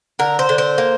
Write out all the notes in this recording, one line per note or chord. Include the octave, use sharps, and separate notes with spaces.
D3 A#4
C5
D3
C5
A#3